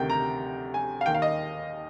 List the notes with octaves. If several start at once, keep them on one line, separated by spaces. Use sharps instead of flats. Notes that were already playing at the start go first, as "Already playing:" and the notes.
Already playing: D2 C3 D#3 G5
A#5
G#5
F5
D#2 D#3 G5
F5
D#5